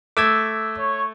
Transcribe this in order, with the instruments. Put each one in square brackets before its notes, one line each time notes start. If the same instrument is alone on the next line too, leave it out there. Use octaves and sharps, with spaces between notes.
[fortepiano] A3 [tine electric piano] D6 E6 G#6
[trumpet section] C#5